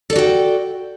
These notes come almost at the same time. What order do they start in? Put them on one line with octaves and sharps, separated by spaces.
A4 D5 F#4 G5